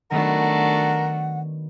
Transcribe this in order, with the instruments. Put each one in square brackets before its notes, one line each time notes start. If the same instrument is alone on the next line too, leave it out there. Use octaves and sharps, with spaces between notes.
[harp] D#3 F#3 B3 [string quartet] A3 D4 F#4 [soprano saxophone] A#4 [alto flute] F#5